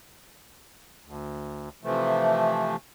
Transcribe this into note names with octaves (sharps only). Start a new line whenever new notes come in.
D2
C3 E3 F3 A3